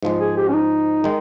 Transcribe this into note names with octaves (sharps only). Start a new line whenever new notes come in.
G#2 F3 G#3
G#4
G4
C#4
D#4
D#3 G#3